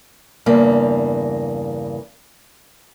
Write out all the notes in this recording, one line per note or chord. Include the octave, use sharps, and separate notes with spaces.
E2 G2 C#3 A#3